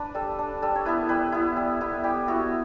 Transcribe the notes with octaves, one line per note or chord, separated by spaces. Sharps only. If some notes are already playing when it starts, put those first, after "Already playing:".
Already playing: D4 B4
G3 A4
D4
G3 A4
C#5
B3 E4 B4
G3 B4
B3 E4
G3
B3 E4
G3 G4
B3 E4 F#4